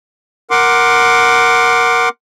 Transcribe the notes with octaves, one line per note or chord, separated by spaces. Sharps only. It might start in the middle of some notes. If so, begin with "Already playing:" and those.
A#4 F#5 C6 D6